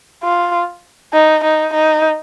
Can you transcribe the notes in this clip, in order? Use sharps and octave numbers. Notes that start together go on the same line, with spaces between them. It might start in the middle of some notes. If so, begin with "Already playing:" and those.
F4
D#4
D#4
D#4